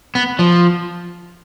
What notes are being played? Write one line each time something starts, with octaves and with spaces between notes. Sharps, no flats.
B3
F3